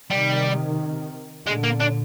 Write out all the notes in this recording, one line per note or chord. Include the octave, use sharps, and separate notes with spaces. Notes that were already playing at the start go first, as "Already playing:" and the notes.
C3 D#3 G3
A#2 D3 G#3
A#3
D4